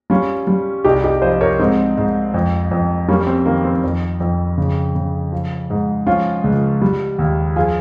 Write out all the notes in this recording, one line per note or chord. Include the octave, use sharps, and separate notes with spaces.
G3 C#4 F4
G3
C2 D#4 G4
D#4 G4
F3 C5 D#5
A#4 C#5
G#2 C4 D#4
G#2
F2
F2
G3 A#3 C#4
C4
D#3 A#3
C4
F2
F2
C#3
C#3
F3
G#2
F3 C#4 F4
C#2
G3
D#2
F3 F4 G#4